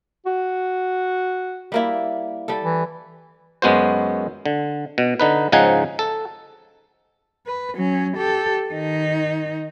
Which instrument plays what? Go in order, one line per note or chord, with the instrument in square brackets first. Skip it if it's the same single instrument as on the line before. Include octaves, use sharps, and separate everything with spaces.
[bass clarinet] F#4
[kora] G3 A#3 E4
G3 A4
[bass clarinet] E3
[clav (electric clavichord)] F#2 G#3 B3 F#4 C5
D3
B2
D3 D#4 B4
G#2 C#3 F3 D#4 F#5 G#5
A4
[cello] B4
F#3 C#4
G4 A4
D#3 D#4